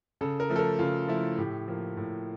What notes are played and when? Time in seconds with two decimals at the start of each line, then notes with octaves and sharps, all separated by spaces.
0.21 C#3 A4
0.40 A#4
0.50 F3 A3
0.56 A4
0.59 A#4
0.79 C#3 F4
1.08 F3 A3 E4
1.38 A2 G4
1.68 F3 A#3
1.97 A2